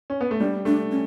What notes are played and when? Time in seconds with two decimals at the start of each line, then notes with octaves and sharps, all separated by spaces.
0.10 C#4
0.21 B3
0.31 A3
0.40 G3 D4
0.65 A3 D4
0.91 C#4